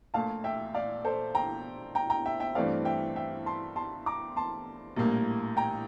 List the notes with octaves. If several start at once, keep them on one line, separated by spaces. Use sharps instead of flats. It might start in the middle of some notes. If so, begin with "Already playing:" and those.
A#1 A#2 A3 F5 A5
E5 G5
D5 F5
A4 C5
G5 A#5
G5 A#5
G5 A#5
E5 G5
E5 G5
G2 E3 A3 C4 D5 F5
E5 G5
E5 G5
A5 C6
A5 C6
A#5 D6
A5 C6
A#1 A2 G3 A#3
G5 A#5